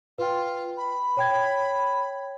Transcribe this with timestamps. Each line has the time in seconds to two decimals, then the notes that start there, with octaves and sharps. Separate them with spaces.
0.18 F4 B4 G5
0.77 B5
1.17 C#5 G5 G#6